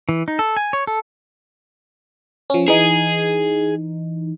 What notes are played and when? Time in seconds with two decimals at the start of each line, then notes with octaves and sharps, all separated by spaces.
0.09 E3
0.28 D#4
0.39 A4
0.57 G#5
0.73 C#5
0.87 A4
2.50 F3 C#4
2.68 E3 D#4 G#4